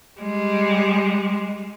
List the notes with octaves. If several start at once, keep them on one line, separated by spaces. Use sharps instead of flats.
G3 G#3